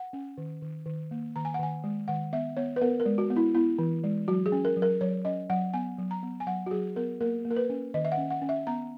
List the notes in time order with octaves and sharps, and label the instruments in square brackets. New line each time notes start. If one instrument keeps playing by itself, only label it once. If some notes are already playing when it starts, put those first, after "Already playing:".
Already playing: [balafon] F#5
C#4
D#3
D#3
D#3
A#3
D#3 A#5
G#5
F#5
D#3 G#5
G#3
D#3 F#5
B3 E5
B3 C#5
B4
B3 A#4
A#4
G#3
F#4
B3
E4
B3 E4
E3
G#3
F#3 F#4
G#4
C#4
A#4
F#3
A#4
F#3 C#5
C#4 D#5
F#3 F#5
B3 G#5
F#3
A#5
B3
G#5
F#3 F#5
F#4
F#3 G#4
B3 A#4
A#3 A#4
A#3
A#4
B4
C#4
D#3 D#5
E5
F#5
C#4
F#5
C#4
E5
B3 A#5